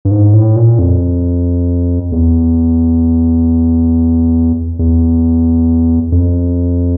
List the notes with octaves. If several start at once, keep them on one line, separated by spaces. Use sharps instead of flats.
G2
G#2
A2
A#2
F2
E2
E2
F2